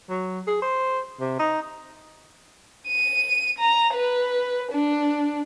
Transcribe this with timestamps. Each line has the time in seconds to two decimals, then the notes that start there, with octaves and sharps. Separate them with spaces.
0.09 F#3
0.47 G#4
0.62 C5
1.20 C3
1.39 D#4
2.88 D#7
3.59 A#5
3.94 B4
4.72 D4